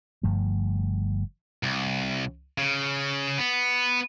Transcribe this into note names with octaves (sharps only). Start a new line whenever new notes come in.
G1 G2 F3 A3
C2
C#3
B3